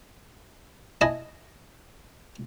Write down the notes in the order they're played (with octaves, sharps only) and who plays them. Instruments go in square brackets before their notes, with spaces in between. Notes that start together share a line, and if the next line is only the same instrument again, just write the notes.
[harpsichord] E4 D#5 G#5 A5